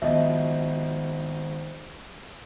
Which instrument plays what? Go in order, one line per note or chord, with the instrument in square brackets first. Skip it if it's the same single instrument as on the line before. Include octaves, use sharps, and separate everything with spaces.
[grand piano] G#1 B2 F3 [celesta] D#5 E5